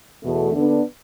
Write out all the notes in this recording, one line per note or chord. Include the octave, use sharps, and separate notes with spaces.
E2 B2 A3
D3 B3 D4